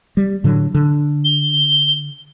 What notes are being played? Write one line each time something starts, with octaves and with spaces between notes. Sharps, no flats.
G3
A2 D3 F#3
D3
G7